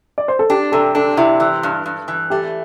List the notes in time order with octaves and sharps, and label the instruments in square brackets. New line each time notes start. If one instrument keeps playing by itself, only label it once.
[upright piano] D5
C5
A4
[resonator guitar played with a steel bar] D4 [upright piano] G4
[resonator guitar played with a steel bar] C3 [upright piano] A4
[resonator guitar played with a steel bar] D4 [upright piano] A4
[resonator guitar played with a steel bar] C3 [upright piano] E4
[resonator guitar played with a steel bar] E3
G2
G2
E3
[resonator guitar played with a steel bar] A3 [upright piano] G4